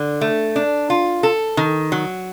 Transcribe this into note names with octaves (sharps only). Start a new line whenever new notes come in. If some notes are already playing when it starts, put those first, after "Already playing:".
Already playing: D3
A3
D4
F4
A4
D#3
F#3